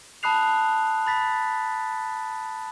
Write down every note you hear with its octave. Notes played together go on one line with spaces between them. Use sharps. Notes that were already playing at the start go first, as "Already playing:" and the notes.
A5 B5 D#6 F#6 C7 F7
B5 A6 B6